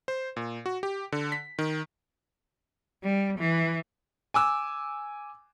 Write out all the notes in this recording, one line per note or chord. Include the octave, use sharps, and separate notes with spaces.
C5
A#2
F#4
G4
D3
B6
D#3
G3
E3
G#5 D6 E6